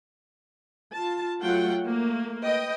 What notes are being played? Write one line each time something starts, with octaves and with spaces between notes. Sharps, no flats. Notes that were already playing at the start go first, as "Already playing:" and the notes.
F4 A5
F#3 A3 F4 F#5 G5
A3 A#3
B4 D#5 G5